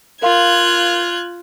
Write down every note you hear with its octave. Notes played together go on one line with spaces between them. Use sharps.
F4 A#4 F5 C6 F#6 G#6